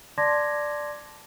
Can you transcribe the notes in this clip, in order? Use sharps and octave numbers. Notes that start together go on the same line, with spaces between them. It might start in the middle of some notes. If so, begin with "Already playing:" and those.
D5 A5 C6 D6 G#6 A#6